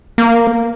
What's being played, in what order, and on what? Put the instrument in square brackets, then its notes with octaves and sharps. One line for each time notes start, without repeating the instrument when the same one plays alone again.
[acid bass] A#3